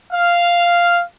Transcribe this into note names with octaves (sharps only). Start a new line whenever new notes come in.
F5